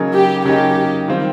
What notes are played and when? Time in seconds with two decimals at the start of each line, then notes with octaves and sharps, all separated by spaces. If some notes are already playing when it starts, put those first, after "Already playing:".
Already playing: C#3 F#3 A#3 D#4 G#4
0.14 G4
0.45 C#3 F#3 A#3 D#4 G4 G#4
1.08 D#3 G3 C4 F4